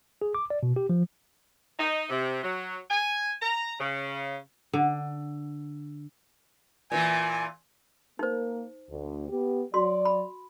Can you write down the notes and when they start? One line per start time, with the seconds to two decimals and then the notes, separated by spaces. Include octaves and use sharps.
0.22 G#4
0.35 D6
0.50 D5
0.63 B2
0.76 G4
0.89 F3
1.79 D#4
2.10 C3
2.44 F#3
2.90 G#5
3.42 A#5
3.79 C#3
4.73 D3
6.92 A#2 E3 G#5
8.19 A#3 D#4 A#4 C5
8.89 D2
9.29 B3 G4
9.74 F#3 F#4 D5 C6
10.05 B5